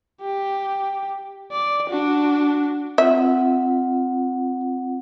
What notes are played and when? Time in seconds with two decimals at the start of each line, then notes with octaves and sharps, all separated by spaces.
0.22 G4
1.52 D5
1.89 D4 F#4
2.98 C4 F4 E5 F#5